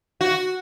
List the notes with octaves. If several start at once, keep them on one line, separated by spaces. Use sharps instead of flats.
F#4